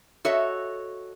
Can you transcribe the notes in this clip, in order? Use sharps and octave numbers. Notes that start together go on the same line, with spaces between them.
F#4 A4 C#5 D#5 E5